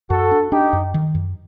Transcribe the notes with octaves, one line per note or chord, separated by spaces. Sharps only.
F#2 F#4 A4
D4
D4 D#4 G4
F#2
D#3
F#2